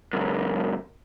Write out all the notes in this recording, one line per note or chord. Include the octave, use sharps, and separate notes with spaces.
C#2 F#2